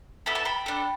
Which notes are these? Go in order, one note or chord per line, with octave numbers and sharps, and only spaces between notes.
B3 E4 A4 B5
A5
G5 B5
D4 A4